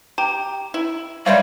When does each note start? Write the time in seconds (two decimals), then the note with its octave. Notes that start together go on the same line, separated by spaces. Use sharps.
0.18 G4 A#5
0.74 E4
1.26 G3 A#3 C5 C#5 E5 F5